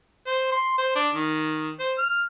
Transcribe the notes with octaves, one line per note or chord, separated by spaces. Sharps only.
C5
C6
C5
D4
D#3
C5
F6